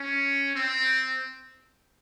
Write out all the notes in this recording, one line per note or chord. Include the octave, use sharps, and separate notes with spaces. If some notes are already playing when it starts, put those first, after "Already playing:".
Already playing: C#4
C4